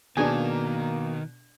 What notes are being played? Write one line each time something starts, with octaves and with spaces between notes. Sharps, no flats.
B2 D#3 A#3 D4 G#4 G#5